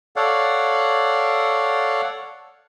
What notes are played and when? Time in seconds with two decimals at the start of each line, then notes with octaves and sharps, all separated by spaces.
0.16 A4 C#5 D5 F5 F#5